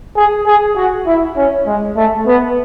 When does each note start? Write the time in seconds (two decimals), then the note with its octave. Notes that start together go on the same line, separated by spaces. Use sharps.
0.16 G#4
0.47 G#4
0.76 F#4
1.06 E4
1.37 C#4
1.67 G#3
1.97 A3
2.27 B3